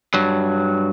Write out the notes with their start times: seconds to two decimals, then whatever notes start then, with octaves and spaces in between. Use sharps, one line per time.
0.14 G2 F#3